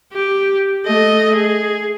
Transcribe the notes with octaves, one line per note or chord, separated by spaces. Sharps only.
G4
A3 D#5
G#4